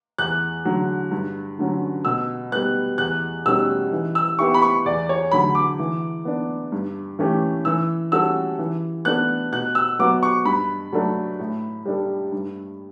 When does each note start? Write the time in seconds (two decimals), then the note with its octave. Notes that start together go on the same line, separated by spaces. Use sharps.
0.18 E2 F#6
0.65 D3 F#3
1.11 G2
1.59 D3 F#3 C#4
2.05 B2 E6
2.52 G3 B3 F#6
2.98 E2 F#6
3.46 B2 G3 C#4 E6
3.93 E3
4.15 E6
4.39 B3 E4 G4 C#6
4.54 B5
4.62 C#6
4.85 E2 D5
5.09 C#5
5.31 D3 F#3 A3 B5
5.55 D6
5.79 E3
6.25 B3 D4
6.72 G2
7.19 E3 A3 C#4 G4
7.65 E3 E6
8.12 G3 C#4 F#4 A4 E6
8.59 E3
9.05 B3 D4 A4 F#6
9.52 B2 F#6
9.75 E6
9.99 F#3 B3 F#4 D6
10.23 C#6
10.45 G2 B5
10.93 F#3 A3 D4 A4
11.39 A2
11.86 G3 D4 A4
12.32 G2